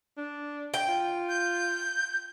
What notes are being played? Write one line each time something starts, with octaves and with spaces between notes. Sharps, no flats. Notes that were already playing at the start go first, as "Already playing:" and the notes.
D4
G5
F4
G6